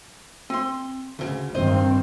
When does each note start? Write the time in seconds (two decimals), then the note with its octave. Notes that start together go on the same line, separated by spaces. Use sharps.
0.50 C4 C6
1.19 D2 A#2 C#3
1.55 G2 D#3 C4 C5 D#5